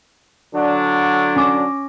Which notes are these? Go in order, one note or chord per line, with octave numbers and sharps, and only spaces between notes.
D3 F#3 D4
C#4 D6 A#6